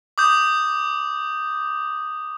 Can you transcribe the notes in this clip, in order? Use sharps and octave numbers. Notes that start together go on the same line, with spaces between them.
D6 D#6 G6